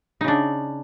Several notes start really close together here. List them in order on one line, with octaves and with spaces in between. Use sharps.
D#4 C#3 D4